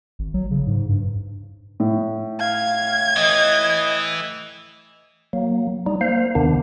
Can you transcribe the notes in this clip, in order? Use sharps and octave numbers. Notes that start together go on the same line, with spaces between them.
G#1
F#3
C#3
G#2
G2
A2
F5 G#6
E3 D#5
F#3 A#3
G3 D#4
A#3 C5 F5
D#2 C3 D#3 B3 D4